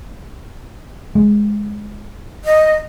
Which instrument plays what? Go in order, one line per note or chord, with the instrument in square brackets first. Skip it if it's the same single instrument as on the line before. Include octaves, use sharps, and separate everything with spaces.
[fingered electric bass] G#3
[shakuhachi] D#5